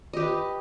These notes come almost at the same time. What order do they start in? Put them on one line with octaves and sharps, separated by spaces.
D#5 G4 B4